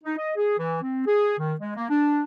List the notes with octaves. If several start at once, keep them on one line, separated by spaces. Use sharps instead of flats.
D#4
D#5
G#4
E3
C4
G#4
D#3
G#3
A#3
D4